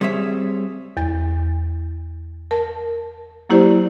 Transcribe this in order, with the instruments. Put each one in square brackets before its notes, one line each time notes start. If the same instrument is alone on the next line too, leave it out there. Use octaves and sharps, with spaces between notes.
[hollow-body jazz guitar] G3 C4 G#4 C#5 E5
[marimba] E2 A6
A#4 A5
F#3 A#3 E4 G4 C5 D5